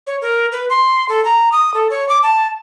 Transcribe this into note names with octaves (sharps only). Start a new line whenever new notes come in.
C#5
A#4
B4
C6
A4
A#5
D#6
A4
C#5
D6
A5